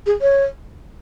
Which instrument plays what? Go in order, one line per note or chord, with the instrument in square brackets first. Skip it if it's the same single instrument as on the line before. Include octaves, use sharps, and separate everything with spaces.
[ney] G#4
C#5